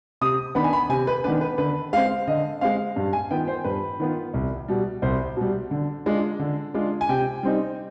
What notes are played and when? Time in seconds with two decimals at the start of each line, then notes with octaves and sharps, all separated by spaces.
0.21 C3 D#6
0.55 D#3 B3 D4 B5
0.64 G#5
0.73 B5
0.89 C3 G#5
1.07 B4
1.24 D#3 B3 D4 B4
1.41 B4
1.58 D3 B4
1.93 G#3 C4 F5
2.27 D3 D#5
2.61 G#3 C4 F5
2.96 G2
3.13 G#5
3.31 D#3 B3 F4 G5
3.48 C5
3.64 G2 B4
4.00 D#3 B3 F4
4.34 C2
4.68 B2 G3
5.02 C2 C5
5.37 B2 G3
5.71 D3
6.06 G#3 D4 F4
6.39 D3
6.74 G#3 D4 F4
7.01 G#5
7.09 C3 G5
7.43 G3 C4 D#4